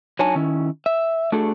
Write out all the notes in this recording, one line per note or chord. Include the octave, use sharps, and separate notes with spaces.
F#3 D4 D#4 C#5 G#5 A5
D#3 C#4 E4
E5
A3 D4 F#4 G#4 A4